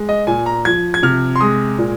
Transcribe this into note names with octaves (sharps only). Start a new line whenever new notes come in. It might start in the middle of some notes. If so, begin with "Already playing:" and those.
Already playing: G#3
D#5
A#2 G#5
A#5
F3 G#6
G#6
C3 F6
C6
G#3 D#6
A#2